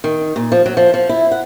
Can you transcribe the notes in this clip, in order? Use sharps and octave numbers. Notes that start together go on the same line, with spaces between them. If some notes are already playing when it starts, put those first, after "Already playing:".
D#3
A#2
F3
F#3
F3
F3
E4
F#5